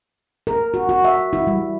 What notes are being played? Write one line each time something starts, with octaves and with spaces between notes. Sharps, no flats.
A#4
F#4
F#4
E5
E4
G3